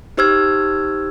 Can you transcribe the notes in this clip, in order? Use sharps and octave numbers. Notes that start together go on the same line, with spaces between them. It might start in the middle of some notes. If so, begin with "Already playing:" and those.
D#4 G4 C5 E6 F6 G#6